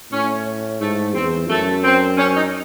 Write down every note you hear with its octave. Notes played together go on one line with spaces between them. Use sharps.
A2 C#4
G#2 A3
E2 C4
F#2 A3
C4
C#4
D#4